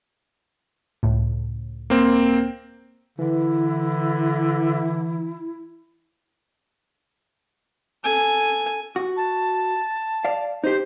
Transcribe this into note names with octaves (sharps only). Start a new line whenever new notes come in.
C#2 A2
A#3 C4
D3 E3 E4
A4 G#5
F#4
A5
D5 F5
D#4 G4 C5